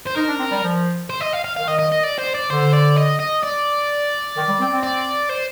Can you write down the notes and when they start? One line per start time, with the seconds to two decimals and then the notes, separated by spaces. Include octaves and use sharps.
0.07 C5
0.16 D#4 A#4
0.28 D4
0.39 C4
0.51 G3
0.63 F3
1.10 C5
1.21 D#5
1.33 F5
1.45 F5
1.57 D#3 F5
1.68 D#5
1.79 D#5
1.92 D#5
2.04 D5
2.19 C5
2.34 D5
2.50 D3 C5
2.73 D5
2.97 D#5
3.19 D#5
3.43 D5
4.36 D#3
4.48 G3
4.60 C4
4.71 C4
4.83 D5
5.29 C5